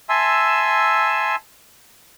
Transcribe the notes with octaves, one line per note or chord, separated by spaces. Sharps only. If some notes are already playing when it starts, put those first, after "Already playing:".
E5 G#5 A5 C6 E6